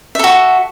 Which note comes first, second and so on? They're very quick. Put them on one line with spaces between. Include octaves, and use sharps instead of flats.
E5 A4 F#4